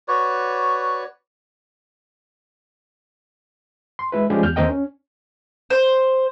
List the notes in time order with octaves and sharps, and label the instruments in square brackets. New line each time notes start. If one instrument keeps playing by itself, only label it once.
[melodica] F#4 B4 C#5 D5
[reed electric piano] C6
G#3 E4 B4
F3 G3 G#3 C#4 G4 G#4
E2 F6 G6
D#2 C4 A#4 D#5 G5
C#4
[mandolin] C5